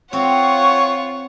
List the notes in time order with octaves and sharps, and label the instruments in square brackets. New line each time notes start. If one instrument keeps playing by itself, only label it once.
[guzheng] C4 [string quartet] F4 [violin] C#5 F#5 [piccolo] C#6